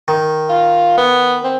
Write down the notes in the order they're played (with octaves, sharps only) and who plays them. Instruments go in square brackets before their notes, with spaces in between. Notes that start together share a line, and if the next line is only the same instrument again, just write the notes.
[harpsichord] D#3
[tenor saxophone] F4
B3
C4